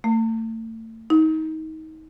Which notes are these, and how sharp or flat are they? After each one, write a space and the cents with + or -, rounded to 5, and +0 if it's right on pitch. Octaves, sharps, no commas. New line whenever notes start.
A3 +35
D#4 +25